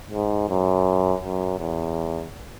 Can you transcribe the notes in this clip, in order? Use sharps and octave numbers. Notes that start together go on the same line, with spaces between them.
G#2
F#2
F#2
E2